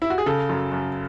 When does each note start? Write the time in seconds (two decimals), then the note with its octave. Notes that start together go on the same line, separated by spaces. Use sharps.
0.02 E4
0.10 F#4
0.18 G#4
0.26 C#3 A4
0.49 F#2
0.72 F#2